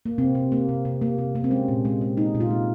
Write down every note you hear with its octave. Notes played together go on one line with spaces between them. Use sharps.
A#3
C3 C4
C3
A#3
C3
C3
A#3
C3
C3 A#3
C4
G#3 C#4
A#2
G#3
G#3
G#3 D#4
A#2
F4
G#3